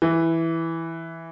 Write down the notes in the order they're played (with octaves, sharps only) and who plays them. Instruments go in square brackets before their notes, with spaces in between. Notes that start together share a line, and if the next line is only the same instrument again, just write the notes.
[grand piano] E3